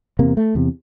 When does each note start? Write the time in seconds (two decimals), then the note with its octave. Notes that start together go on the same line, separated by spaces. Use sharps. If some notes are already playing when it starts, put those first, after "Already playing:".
0.19 E2 C3 A#3
0.37 A3
0.55 E2 C3